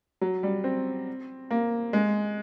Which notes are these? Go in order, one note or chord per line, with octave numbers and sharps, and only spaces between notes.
F#3
G3
C4
A#3
G#3